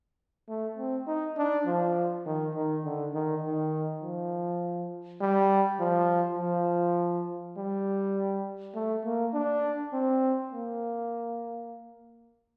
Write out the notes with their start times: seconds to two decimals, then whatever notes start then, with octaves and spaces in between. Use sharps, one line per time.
0.49 A3
0.77 C4
1.08 D#4
1.38 D4
1.66 F3
2.26 D#3
2.55 D#3
2.84 D3
3.15 D#3
3.43 D#3
4.03 F3
5.21 G3
5.80 F3
6.39 F3
7.57 G3
8.75 A3
9.05 A#3
9.34 D4
9.93 C4
10.52 A#3